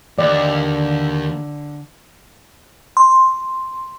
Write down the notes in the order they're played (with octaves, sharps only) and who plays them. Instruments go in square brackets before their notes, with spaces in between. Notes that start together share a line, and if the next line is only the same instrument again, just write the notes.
[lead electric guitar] D#2 [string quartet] D3 [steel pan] D5
[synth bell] C6